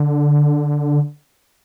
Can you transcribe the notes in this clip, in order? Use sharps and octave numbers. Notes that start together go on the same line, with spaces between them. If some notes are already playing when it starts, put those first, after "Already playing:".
Already playing: D3